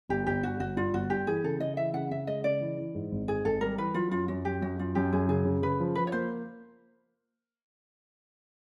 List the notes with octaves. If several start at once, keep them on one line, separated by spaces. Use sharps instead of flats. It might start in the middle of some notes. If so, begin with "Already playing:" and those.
G1 G4
G1 G4
G2 F#4
G1 F#4
G2 F4
G1 F#4
G2 G4
E3 G#4
C#3 A4
C#3 D#5
E3 E5
C#3 F#5
C#3 E5
G#3 D#5
C#3 D5
E3
E3
G#2
G#1
G#2 G#4
G#1 A4
G3 A#4
E3 B4
F#3 F4
F#2 F4
F#2 F#4
F#2 G4
F#2 F#4
F#2 F4
F#2 G4
F#2 G#4
C#3 G#4
C#3
C#3 B4
F3
F3 B4
C#5
A#3 C5